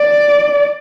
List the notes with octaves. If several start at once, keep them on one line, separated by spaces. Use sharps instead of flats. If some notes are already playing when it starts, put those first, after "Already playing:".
Already playing: D5